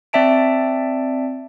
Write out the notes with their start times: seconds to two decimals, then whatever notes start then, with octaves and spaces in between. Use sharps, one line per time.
0.13 C4 D5 E5 A5 D7